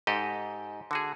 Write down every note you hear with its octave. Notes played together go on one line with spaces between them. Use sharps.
G#2 G4 A4 D#5
D3 F#4 G#4